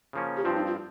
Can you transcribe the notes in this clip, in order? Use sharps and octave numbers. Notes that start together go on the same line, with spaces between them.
C#3 F3 A#3 C#4
G4
G2 F3 C4 F4
D#4
F4